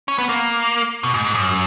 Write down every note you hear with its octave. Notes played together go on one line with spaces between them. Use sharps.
C#4
B3
A#3
B2
G#2
G#2
F#2